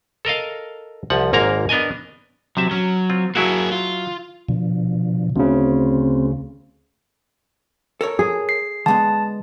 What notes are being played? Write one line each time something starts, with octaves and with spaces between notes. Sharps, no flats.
A4 A#4 D#5 F5
C2 F3 F#5
G#1 G#2 A#3 A#4 C#5 A#5
B3 D4 A#4 D#5 G#5
C3 F#3 C4 E5
F#3 C#4
C4 F4
F#3 A#3 E4 F#4 G#4
F4
B2 D3 F3
D2 C#3 C4
A4 A#4 C#5
G#4
C7
D3 G#3 B3 A5